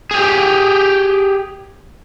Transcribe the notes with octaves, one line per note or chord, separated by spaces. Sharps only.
G4 G#4